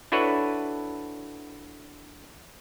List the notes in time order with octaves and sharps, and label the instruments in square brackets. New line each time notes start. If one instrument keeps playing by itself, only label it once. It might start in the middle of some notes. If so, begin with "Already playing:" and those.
[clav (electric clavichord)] D4 E4 F#4 A4 B4 C#5